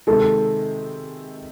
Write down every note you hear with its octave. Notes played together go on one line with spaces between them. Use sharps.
C3 D#3 G#3 A4